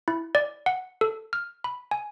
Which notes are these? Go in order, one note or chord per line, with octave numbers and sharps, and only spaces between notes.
E4
D5
F#5
A4
F6
B5
G#5